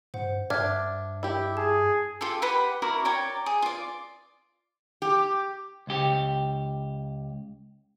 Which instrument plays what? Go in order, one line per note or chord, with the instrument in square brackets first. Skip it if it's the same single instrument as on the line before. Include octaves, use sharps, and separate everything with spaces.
[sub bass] G2 [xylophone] C5 F#5
[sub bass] G2 [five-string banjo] D4 [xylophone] E5 F6 G#6
[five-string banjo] E4 G4
[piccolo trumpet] G#4 [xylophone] A5
[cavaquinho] F4 G4 A4
G4 B4 F#5 B5
E4 F#4 A#4 D5
C#5 D5 G5 A#5
G#4
F4 D5
[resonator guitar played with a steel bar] G4
[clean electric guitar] C#2 G4